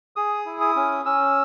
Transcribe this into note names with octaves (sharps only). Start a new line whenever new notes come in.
G#4 D#6
E4
D#6
C#4
C#4 E6